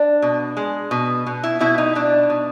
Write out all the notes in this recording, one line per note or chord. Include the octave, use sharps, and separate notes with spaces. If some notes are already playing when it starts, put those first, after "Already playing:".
Already playing: D4
B2
G#3
B2
B2
E4
B2 E4
D#4
B2 D4
B2